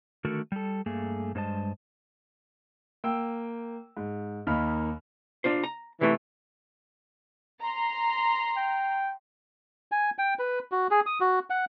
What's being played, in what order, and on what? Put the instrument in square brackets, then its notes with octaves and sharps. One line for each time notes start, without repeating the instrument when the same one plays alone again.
[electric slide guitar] D3 D#3 A3 F#4 A4 A#4
G3 A4
G2 A3 A#3 G#4
G2 G#3 C5 D#5 A5
[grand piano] A#3 G5 E6
G#2
D#2 A#3 D#4 B5 F6
[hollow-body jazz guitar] D4 F4 C5
A#5
[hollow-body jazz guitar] C3 A3 [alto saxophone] E3
[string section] A#5 C6
[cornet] G5
[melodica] G#5
G5
B4
F#4
G#4
D#6
F#4
F#5